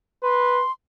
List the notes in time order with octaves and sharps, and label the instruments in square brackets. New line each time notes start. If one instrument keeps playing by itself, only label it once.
[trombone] B4 [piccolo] C6